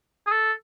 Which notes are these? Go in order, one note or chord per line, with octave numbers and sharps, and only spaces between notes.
G#4
A4